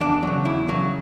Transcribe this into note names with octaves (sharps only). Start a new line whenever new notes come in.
E2 D4
C#3 F#3
E2 E4
C#3 F#3